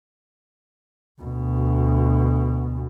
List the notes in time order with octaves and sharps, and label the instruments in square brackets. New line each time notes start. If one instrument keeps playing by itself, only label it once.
[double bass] D2 B2